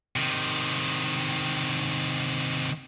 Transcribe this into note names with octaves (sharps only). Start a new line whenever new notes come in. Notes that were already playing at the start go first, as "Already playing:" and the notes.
C3 D#3